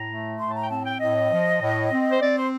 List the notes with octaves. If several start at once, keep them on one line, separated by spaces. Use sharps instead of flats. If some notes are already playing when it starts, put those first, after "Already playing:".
Already playing: A2 A#5
A3
A2 C6
A5
A#5
G5
C4 A5
G5
A2 D#5
F3
A2
C4
C5
C4 D5
C5